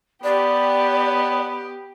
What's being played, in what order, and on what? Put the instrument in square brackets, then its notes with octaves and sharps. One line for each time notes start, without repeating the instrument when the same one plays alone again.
[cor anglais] B3 [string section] G4 [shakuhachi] D5